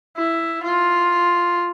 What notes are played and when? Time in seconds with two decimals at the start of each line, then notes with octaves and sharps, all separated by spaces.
0.17 E4
0.64 F4